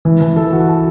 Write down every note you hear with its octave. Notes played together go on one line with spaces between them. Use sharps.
E3
E3
A4
F#4
A4